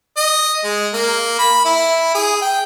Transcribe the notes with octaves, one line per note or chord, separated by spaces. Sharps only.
D#5
G#3
A#3
B5
E4
G#4
G5